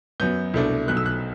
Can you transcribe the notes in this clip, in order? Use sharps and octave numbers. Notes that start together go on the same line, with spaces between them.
F#2 F#3 B3 G6
C2 B2 A3 D4
B1 B2 A3 F#6
E6
F#6